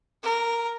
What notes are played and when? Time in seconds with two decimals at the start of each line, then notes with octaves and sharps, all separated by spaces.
0.23 A#4